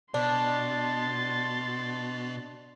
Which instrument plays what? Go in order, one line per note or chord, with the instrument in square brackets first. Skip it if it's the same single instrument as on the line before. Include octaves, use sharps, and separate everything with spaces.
[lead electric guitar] B2 [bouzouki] D4 [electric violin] C6 A6